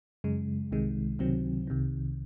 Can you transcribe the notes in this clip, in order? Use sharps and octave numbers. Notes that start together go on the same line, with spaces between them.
F#2 C#3 G#3
C2 C3 D#3 G#3
C#2 C3 D#3 F#3 C4
C2 C3 D#3